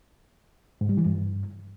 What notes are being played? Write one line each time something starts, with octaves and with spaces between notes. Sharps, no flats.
G#2
G3
E3
G2